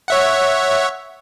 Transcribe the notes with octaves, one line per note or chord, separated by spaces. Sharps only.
C#5 E5 F#5